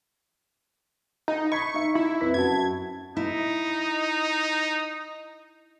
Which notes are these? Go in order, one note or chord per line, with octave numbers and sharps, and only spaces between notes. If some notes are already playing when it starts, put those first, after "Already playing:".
D#4
B5 C#6 G#6 B6
D#4 E5
E4
F2 B4 B6
F#2 F#4 A5 G#6
D#4 E4